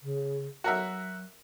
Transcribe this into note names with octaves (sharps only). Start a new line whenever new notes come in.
C#3
F#3 F#4 A#4 E5